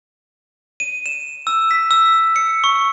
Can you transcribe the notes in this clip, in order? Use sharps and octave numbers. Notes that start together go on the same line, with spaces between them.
D#7
E7
E6
B6
E6
C#7
C#6